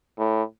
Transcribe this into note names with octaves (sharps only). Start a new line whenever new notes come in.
A2